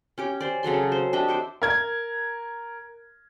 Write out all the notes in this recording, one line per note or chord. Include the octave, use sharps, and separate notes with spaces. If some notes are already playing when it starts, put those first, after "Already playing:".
C#4 G4 D6
C5 D5
C#3 F#3 A4 C6
C5
D4 G4 D#5 E5
F#4 C5 D6
A#4 G#6